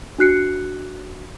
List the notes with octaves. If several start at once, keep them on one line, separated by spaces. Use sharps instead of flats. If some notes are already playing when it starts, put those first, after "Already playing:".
D4 F#4 F#6 C7 C#7